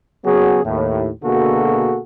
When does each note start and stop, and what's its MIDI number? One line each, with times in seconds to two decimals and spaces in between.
0.25 0.63 49
0.25 0.63 54
0.25 0.63 59
0.25 0.63 66
0.25 0.63 68
0.64 1.09 39
0.64 1.09 45
1.23 2.00 47
1.23 2.00 50
1.23 2.00 58
1.23 2.00 66
1.23 2.00 68
1.23 2.00 69